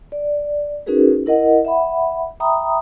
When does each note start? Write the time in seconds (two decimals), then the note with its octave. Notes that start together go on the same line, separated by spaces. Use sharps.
0.12 D5
0.86 C#4 D#4 F#4 G#4 A#4 B4
1.26 E4 A#4 D#5 F#5
1.65 E5 F#5 B5
2.40 E5 G5 A#5 B5 D#6